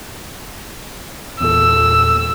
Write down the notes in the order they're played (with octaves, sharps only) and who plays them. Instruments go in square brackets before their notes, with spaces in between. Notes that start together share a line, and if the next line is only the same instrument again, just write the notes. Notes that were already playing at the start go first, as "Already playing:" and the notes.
[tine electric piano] E2 A#2 A4 [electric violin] E6